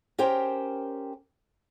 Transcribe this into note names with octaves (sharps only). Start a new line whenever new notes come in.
C#4 G4 A#4 C5 G5